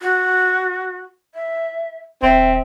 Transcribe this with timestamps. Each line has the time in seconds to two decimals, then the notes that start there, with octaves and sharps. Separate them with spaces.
0.01 F#4
1.35 E5
2.22 D#1 C4 E5